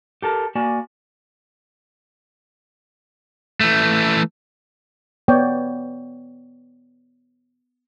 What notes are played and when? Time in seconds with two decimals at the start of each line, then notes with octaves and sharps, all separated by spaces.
0.22 G4 A4 A#4
0.55 A#3 F#4 D5 G#5
3.61 E3 A3
5.28 B3 C#5 D5 G5